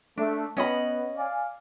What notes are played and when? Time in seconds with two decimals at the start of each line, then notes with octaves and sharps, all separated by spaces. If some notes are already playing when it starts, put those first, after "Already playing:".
0.18 A3 D4
0.57 B3 C#4 D#5 B5
1.17 D5 F5 G#5